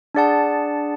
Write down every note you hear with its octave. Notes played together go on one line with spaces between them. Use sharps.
D4 G#4 D5 F#5 A5